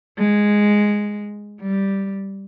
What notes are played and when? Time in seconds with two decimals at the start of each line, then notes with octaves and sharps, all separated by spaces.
0.18 G#3
1.60 G3